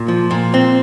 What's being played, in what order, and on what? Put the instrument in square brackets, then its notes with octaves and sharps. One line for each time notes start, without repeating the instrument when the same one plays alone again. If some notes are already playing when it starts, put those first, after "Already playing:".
Already playing: [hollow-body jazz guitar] A#2
F3
A#2
C4